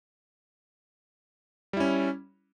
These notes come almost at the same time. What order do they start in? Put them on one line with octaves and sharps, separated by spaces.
G3 E4 C#4